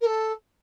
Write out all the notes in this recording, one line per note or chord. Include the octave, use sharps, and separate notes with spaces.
A#4
A4